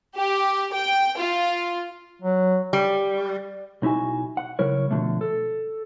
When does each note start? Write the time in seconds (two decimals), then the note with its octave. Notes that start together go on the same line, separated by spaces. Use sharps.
0.15 G4
0.72 G5
1.17 F4
2.22 F#3
2.73 G3
3.82 B1 D#4 E4 F#4 G#5
4.37 F#5
4.59 C#3 F#3 E4 A#4 C#5
4.91 B2 D3 F3 A3
5.21 A4